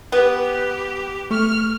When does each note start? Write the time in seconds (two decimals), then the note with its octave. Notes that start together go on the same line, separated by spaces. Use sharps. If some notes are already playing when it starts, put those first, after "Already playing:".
0.12 B3 G4
1.31 A3 C#6 F6